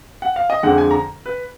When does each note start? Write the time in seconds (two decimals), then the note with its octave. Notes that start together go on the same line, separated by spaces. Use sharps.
0.22 F#5
0.36 F5
0.50 D#5
0.63 F2 D3 G#3 F#5
0.78 G#5
0.91 A#5
1.26 B4